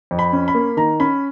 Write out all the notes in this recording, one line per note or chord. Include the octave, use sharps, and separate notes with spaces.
F2
B5
C#4
B5
A#3
D#3 A#5
C#4 B5